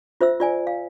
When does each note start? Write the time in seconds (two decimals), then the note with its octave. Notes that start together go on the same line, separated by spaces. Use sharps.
0.21 F4 C5 E5 E6
0.40 F4 D5 G#5
0.67 F5